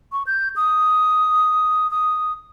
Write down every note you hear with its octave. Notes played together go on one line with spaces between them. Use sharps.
C#6
G6
D#6
D#6